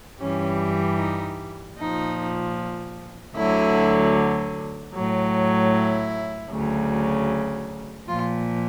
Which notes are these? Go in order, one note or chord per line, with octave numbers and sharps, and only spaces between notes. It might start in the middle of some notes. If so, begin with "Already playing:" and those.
G2 E3 G3 C#4
D#4
A#2 F3 D#4
D2 D3 F#3 E4
A2 F#3
E4
D2 C#3 F#3
A#2 F3 F4